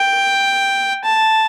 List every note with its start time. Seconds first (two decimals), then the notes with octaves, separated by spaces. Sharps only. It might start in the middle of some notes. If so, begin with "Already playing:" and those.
Already playing: G5
1.04 A5